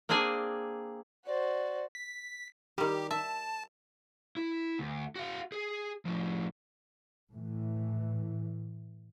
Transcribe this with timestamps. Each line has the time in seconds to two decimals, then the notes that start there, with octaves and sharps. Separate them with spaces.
0.09 A#3 C4 D4 G#4 G#5
1.27 F#4 C5 D5
1.95 B6
2.78 D#3 G3 G4
3.11 E5 A5
4.37 E4
4.79 D2
5.16 F#4 F5
5.52 G#4
6.05 A2 F3
7.32 A2 E3